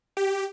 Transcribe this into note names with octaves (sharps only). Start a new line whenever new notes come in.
G4